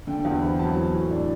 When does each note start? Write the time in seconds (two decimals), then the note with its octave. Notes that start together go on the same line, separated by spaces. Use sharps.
0.07 D3 G5
0.25 E2
0.42 C4 B5
0.59 F#3 A5
0.76 E3
0.94 A2
1.10 D4